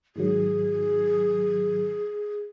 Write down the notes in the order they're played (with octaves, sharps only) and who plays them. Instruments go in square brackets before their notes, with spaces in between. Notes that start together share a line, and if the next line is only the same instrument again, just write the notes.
[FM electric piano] G#2 D#3 F#3 [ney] G#4